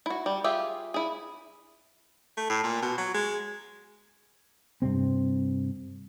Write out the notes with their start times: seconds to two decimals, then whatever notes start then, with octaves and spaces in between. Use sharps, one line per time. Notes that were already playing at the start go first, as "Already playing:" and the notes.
0.06 E4 F#4
0.26 G3
0.44 F4 G4 G#4 E5
0.94 E4 G#4
2.37 A3
2.49 A2
2.63 A#2
2.82 B2
2.98 F#3
3.14 G#3
4.82 G2 C3 C4